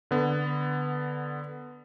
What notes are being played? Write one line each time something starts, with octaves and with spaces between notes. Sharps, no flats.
D3 B3